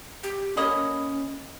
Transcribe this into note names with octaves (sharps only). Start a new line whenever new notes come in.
G4
A#3 C#4 D#5 B5